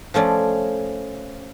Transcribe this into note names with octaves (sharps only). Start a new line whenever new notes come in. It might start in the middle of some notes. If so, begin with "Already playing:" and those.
F3 A3 C#4 D5